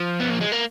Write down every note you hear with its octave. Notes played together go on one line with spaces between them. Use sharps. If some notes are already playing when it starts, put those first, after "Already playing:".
Already playing: F3
B3
A#3
G#3
A#3